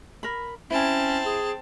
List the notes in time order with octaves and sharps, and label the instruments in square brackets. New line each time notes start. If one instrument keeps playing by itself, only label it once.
[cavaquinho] A#4 B5
[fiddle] C4 A5 [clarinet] C#4 [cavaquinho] E4 G#5
[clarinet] G#4